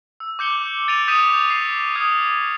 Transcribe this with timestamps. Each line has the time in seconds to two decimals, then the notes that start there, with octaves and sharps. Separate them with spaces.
0.20 E6
0.39 D6 G6 C#7 G7
0.88 A6 D7 D#7 F7
1.08 C#6 D#6 G6 B6 D#7 E7
1.50 C7
1.95 D#6 F6 G#6 D7